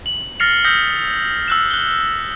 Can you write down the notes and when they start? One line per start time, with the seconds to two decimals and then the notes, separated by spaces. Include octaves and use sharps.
0.06 F#7
0.40 F6 A6 A#6 C7 C#7 F7
0.64 D#6 E6 G6 A#6 B6 C#7
1.48 E6 F#6 E7
1.71 F#6 G7